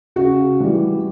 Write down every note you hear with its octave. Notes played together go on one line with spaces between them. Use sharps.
C#3 F#4
E3 G3